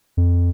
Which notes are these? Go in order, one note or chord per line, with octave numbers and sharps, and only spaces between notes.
F2